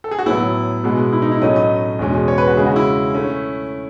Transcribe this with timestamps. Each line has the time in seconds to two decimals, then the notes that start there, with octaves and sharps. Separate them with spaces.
0.04 A4
0.11 G#4
0.19 F#4
0.26 A2 F#3 B3 E4
0.84 B2 G#3 B3
1.13 E4
1.22 D#4
1.32 E4
1.42 A2 F#3 A3 C#4 D#5
1.56 D#5
1.99 E2 B2 G#3 C#4
2.28 C#5
2.38 B4
2.47 F#4
2.57 C#3 G#3 C#4 G#4
2.67 F#4
2.76 E4
3.14 A3 C#4